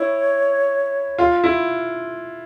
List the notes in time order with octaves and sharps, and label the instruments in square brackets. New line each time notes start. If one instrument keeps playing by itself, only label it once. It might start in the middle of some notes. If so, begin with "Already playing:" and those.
Already playing: [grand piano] E4 [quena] C#5
[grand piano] F4
E4